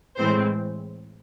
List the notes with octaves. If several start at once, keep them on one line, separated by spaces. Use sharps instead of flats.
A2 E3 G#3 C4 C5